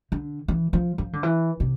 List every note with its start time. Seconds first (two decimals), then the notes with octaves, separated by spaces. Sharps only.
0.12 D3
0.48 E3
0.73 F3
0.98 F3
1.13 D3
1.23 E3
1.60 C3